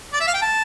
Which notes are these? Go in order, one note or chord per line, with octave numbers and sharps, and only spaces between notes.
D5
E5
F5
G5
A5